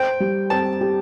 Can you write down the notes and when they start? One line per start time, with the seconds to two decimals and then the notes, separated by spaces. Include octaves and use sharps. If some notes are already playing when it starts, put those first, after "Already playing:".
Already playing: C5 G5
0.20 G3
0.50 C4 A5
0.81 G4